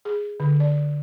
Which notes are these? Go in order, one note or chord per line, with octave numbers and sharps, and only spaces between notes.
G#4
D3
D5